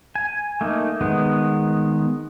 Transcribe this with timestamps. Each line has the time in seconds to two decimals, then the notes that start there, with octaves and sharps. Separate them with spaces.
0.15 G#5
0.61 A3 A#3 D#4
1.01 D#3 G#3 B3